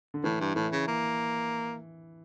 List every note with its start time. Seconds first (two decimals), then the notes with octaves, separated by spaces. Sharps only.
0.14 D3
0.24 A2 E3
0.40 G2
0.56 A2 E3
0.72 C#3
0.88 A#3